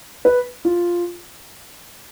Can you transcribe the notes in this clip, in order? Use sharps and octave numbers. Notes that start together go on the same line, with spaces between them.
B4
F4